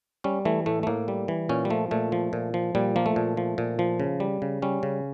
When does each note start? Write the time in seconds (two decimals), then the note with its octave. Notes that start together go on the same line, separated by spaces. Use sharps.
0.24 G3 C#4
0.45 E3 A3
0.66 A2 A3
0.83 A3
0.87 A2 A#3
1.08 G3
1.28 E3
1.49 A#2 C#4
1.65 G3
1.70 F3 A3
1.91 A#2 A3
2.12 F3
2.33 A#2
2.54 F3
2.75 A#2 G3
2.96 F3 A#3
3.06 A3
3.16 A#2
3.37 F3
3.58 A#2
3.79 F3
4.00 C#3
4.20 G3
4.42 C#3
4.62 G3 C#4
4.83 C#3